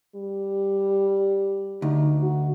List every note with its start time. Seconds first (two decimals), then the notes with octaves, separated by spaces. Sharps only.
0.15 G3
1.82 D2 D#4
2.22 F#4